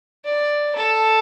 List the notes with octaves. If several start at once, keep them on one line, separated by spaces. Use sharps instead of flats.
D5
A4